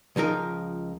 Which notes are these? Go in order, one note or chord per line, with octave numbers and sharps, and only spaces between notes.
C#2 F3 D#4 A#4